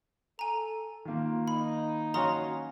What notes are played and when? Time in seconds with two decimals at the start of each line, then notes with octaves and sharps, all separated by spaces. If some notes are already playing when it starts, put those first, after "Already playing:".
0.39 A4 G#5 A#5
1.05 D#3 A#3 F4
1.48 D#4 B5
2.14 C#4 F#4 F5 A#5 C6 D#6